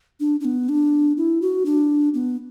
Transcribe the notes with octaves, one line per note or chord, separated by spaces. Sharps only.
D4
D4
B3
D4
E4
F#4
D4
B3